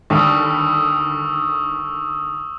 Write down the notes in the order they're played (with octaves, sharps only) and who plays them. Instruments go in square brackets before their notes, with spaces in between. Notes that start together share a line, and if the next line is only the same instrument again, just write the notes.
[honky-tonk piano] D#2 D3 G3 [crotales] C#6 D#6 E6